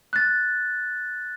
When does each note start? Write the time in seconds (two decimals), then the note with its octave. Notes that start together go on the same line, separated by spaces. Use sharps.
0.13 F#6 A6